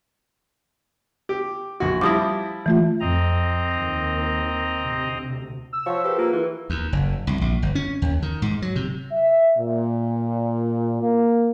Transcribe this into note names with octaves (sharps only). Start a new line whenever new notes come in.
G4
A#1 F#4
F3 G3 E4 D6 D#6 A#6
E3 A3 F4
F2 C4 D#5 A#5
D#2 D#3
D2 C3
E6
F3 C#5 F5 F#5 C#6
G4 G#4 A#4 B4
A#3 F4 G4
E3 B4
D#2
F#1
C2
A#1
G1
C#4
D#2
D#3
G#2
F#3
C3
E5
A#2
A#3